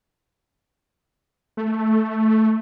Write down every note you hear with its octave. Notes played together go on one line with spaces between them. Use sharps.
A3